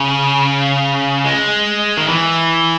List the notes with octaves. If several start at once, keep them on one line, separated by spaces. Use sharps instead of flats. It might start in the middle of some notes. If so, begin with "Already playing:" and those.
Already playing: C#3
G#3
D#3
E3